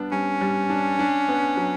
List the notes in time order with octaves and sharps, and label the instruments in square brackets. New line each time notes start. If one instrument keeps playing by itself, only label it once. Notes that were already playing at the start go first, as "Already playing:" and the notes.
Already playing: [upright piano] G3 B3 D4
[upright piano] G3 [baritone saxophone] C#4
[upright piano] G3
D4
D4
B3
F#3